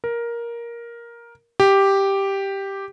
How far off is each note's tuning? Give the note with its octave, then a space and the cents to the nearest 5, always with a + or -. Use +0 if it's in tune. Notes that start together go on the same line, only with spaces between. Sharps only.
A#4 +10
G4 +0